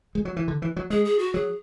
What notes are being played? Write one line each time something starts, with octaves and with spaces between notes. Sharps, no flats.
G#3
F#3
E3
D3
E3
F#3
G#3 G#4
G#4
F#4
F#3 G#4